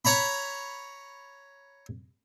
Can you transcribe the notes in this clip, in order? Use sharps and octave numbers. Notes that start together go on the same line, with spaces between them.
C#5 A#5 B5